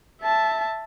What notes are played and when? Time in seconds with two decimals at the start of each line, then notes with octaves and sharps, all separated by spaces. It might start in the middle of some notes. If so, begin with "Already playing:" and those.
0.22 E5 A5